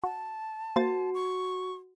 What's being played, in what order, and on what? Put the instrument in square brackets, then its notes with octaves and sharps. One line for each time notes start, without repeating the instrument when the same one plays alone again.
[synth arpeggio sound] F#4 [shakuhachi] A5
[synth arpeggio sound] A#3 C5 A6 [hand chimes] F#4
[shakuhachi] C#6